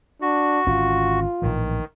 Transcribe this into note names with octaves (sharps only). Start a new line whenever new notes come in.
D4 F#4
G#1 D3 C#4 F4
A#1 A2 D#3 E3